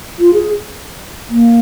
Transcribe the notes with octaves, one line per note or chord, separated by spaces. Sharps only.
F4
G#4
A#3